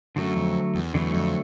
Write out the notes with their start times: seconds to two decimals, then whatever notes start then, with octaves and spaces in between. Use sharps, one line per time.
0.16 F#2 D3 F#3 A3
0.36 F2
0.75 E2
0.94 E2 D3 F#3 A3
1.14 F2